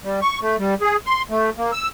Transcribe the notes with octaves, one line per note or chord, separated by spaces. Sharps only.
G3
C#6
A3
G3
G#4
C6
A3
A#3
E6